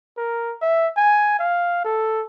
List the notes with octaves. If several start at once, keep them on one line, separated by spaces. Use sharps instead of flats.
A#4
E5
G#5
F5
A4